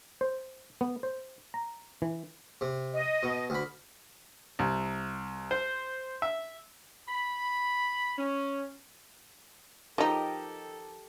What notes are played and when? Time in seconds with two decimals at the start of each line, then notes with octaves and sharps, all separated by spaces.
0.21 C5
0.81 B3
1.03 C5
1.54 A#5
2.02 E3
2.61 C3
2.92 D#5
3.23 B2
3.50 D2 B5
4.59 C2
5.51 C5
6.22 E5
7.08 B5
8.17 C#4
9.98 F3 D#4 G4 A4 A#4 D#5